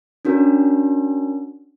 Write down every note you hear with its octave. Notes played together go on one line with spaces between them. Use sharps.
C#4 D4 F#4 A#4